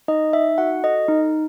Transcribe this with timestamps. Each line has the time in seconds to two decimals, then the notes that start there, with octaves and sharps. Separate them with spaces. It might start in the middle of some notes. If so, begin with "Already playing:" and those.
0.08 D#4 D#5
0.33 D#4 E5
0.58 F#4 F#5
0.83 A4 D#5
1.08 D#4